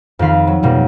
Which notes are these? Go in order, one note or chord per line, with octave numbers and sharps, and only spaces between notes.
F2 D#3 F5 B5
F#3
F2 B2 G3 A#3